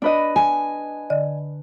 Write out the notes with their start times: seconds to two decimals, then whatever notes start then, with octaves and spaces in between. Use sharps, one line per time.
0.02 D4 B4 D#5
0.36 G#5
1.10 D3 D5 D#5